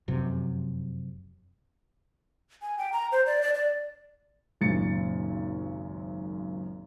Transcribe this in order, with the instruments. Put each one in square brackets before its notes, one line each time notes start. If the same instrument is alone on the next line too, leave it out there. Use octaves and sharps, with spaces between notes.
[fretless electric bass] F1 F#2 C3
[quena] G#5
G5
A#5
C5
D5
D5
D5
[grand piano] G#1 C#2 F#2 A#2 A6 C#7